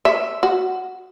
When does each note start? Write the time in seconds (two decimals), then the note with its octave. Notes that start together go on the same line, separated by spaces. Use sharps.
0.05 E5
0.43 F#4